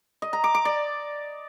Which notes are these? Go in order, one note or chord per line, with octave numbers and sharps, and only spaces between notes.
D#5
A#5
D6
D6
D5